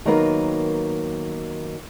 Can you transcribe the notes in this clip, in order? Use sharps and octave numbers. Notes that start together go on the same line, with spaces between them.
D#3 F#3 A#3 B3 A#4 B4